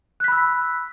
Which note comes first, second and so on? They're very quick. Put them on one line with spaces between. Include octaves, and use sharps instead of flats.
F#6 B6 B5 E6